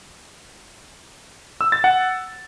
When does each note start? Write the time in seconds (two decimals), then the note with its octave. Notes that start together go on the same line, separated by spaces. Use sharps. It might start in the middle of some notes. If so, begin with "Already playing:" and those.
1.61 E6
1.72 A6
1.84 F#5